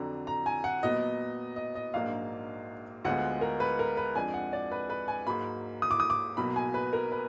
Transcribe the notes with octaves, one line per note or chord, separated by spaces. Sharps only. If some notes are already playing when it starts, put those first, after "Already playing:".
Already playing: F2 D3 F#3 D4 A#5
A#5
G#5
F#5
A#2 F#3 B3 D#5
D#5
D#5
A#1 G#2 F#3 A#3 D4 F5
D2 D3 G#3 B3 F4 F#5
A#4
B4
A#4
B4
F2 F3 G#3 D4 G#5
F#5
D5
B4
B4
G#5
G#2 F#3 A#3 B5
D#6
D6
D#6
D6
B1 B2 F#3 A#3 B5
G#5
B4
A#4
B4